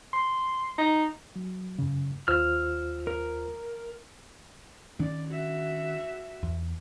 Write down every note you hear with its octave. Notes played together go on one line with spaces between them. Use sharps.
C6
D#4
F#3
F#2 C#3
D#2 F4 C5 E6 F6
A#4
D#3 C#4 D4 D5
F#4 E5
E2